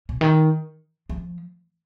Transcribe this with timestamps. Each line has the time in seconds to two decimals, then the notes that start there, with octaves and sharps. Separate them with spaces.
0.09 C3
0.21 D#3
1.10 F3